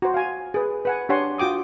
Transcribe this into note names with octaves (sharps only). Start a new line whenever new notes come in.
F#4 C5
F5 G#5
G#4 B4
B4 F#5 G#5
D4 G4 C#5 F#5 G#5 C6
F4 F#4 G5 D6 D#6